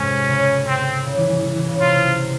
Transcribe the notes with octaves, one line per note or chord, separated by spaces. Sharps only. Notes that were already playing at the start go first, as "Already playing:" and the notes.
Already playing: F2 G#2 C3 C#4
C#3
C4
C#3
E3
E3
E3
E3
C#3
C3 F4